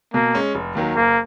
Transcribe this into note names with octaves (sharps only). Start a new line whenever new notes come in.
B2 A#3
G#3 C#4
F1
D#2 D#3 F#3
F#1 A#3